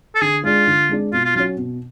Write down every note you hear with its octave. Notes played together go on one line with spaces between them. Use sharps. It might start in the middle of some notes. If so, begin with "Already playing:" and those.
A4
D3 G#4
G#3 D4 F4 G#4 D5
D3
G#3 D4 G#4 D5
B2 F4
F4
F#3 C#4 F4 F#4 C#5
B2